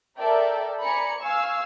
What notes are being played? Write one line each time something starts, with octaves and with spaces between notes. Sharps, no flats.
A4 A#4 D5 E5 G5
D5 G#5 A#5 B5 C#7
F5 G#5 C#6 E6